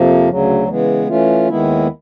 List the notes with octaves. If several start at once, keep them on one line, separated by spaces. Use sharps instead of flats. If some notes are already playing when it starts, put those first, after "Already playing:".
Already playing: F2 C3 F3 A#3
D2 C#3 F#3
C#3 E3 G#3 B3
E3 A3 C#4 F4
D#2 D#3 G#3 B3 E4